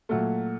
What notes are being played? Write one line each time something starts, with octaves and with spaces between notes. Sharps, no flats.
A#2 F#3 A3